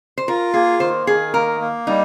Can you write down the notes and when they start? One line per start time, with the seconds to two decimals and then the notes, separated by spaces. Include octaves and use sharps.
0.18 C5
0.28 F4 A#4
0.54 A#3 G#4
0.80 D#3 C5
1.07 D#3 G#4
1.33 A#3 A#4
1.60 A#3
1.87 G3 D#4